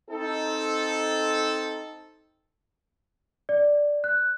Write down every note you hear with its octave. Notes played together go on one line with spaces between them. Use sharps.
C4 D#4 A4
D5
F#6